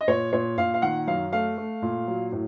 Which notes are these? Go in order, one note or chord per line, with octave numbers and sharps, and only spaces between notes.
D#5
A#2 C#5
A#2 C#5
A#2 F5
F5
D#3 F#5
F#2 F5
A3 F5
A3
A#2
F#3
A2